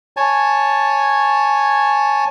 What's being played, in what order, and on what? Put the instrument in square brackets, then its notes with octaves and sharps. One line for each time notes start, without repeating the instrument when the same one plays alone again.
[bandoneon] C#5 G#5 A5